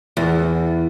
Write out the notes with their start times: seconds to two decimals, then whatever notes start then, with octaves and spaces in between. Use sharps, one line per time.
0.17 E2